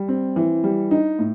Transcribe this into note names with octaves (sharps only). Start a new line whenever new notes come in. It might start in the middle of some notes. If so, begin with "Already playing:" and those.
Already playing: G3
C4
E3
G3
D#4
A2